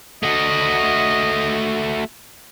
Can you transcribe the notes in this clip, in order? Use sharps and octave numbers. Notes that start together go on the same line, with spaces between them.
A3 F#4 D#5